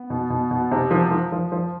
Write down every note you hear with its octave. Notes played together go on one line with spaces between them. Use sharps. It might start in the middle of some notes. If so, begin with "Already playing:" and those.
Already playing: B3
B2
B2
B2
C3
F3
F3
F3
F3